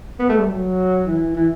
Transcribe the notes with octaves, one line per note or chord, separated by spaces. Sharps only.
B3
A3
G3
F#3
E3
E3